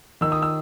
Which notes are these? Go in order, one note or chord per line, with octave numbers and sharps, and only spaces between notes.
D#3 E6
D#6
E6